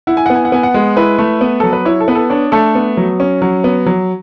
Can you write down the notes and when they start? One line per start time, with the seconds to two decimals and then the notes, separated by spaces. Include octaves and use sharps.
0.07 E4 F#5
0.17 G#5
0.26 B3 F#5
0.35 G#5
0.45 F#5
0.52 B3 G#5
0.63 F#5
0.74 G#3
0.97 E4 B4
1.18 A3
1.41 B3
1.60 F#3 A4
1.73 B4
1.85 E4 C#5
2.00 A4
2.08 B3 B4
2.15 A4
2.30 D4 C#5
2.52 A3 A4
2.75 B3
2.97 F#3
3.20 C#4
3.42 F#3
3.64 B3
3.86 F#3